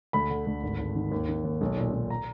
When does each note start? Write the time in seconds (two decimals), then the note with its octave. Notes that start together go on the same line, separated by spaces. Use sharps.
0.13 D2 B5
0.30 D3
0.47 D2
0.63 G#1
0.79 G#1
0.96 D#3
1.12 D#2
1.28 D#3
1.45 D#2
1.61 B1
1.77 A#2
1.94 B1
2.10 A#5